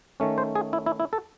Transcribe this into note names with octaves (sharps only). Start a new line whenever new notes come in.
D#3 A3 C#4
C5
G#4
E4
E4
E4
A4